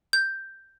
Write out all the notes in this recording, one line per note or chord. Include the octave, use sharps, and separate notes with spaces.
G6